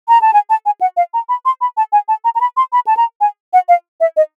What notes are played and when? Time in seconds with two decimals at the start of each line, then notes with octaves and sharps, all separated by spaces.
0.08 A#5
0.22 A5
0.34 G#5
0.50 A5
0.66 G#5
0.81 F#5
0.97 F5
1.14 A#5
1.29 B5
1.45 C6
1.61 B5
1.77 A5
1.92 G#5
2.08 A5
2.25 A#5
2.35 A#5
2.41 B5
2.57 C6
2.73 B5
2.87 A5
2.97 A#5
3.21 G#5
3.53 F#5
3.69 F5
4.00 E5
4.17 D#5